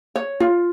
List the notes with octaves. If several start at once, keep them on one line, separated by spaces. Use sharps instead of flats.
C#5
F4